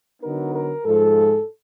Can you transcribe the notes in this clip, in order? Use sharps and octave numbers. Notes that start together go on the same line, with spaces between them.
D3 F#3 B3 D#4 A#4
A#4
G#2 F3 G#3 A4